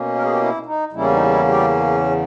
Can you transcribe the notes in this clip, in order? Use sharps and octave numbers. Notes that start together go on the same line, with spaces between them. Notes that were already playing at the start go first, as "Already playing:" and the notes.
Already playing: B2 A#3 C#4
A#4
G#4
G4
E4
D#4
E2 C#3 G3 A#3 C#4 E4
D#4
E4
G3 G4